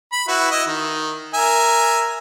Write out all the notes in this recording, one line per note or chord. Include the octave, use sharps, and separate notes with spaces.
B5
E4 F#4 B4
E4 D#5
D#3
A#4 E5 G#5